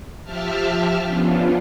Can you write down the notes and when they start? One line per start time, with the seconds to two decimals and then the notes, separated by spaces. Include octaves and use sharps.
0.24 F3 G4 E5 A5 F6
1.03 F3 B3 C#4 D4 F4